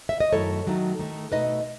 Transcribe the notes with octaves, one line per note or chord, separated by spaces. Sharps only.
E5
D#5
F#2 D#3 A3 E4 A4 C#5
D#3 F#3 A3 D#4
D#3 A3 D#4
B2 A3 D#4 B4 D#5